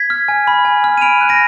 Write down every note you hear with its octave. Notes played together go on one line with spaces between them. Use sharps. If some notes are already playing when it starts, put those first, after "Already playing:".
Already playing: G#6 B6
F6
G#5
B5
G#5
F6
D#7
B5 D7 F7
F#6
A#6 D7